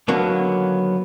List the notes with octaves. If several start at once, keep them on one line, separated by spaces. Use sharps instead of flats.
D3 D#3 F#3 A#3 B3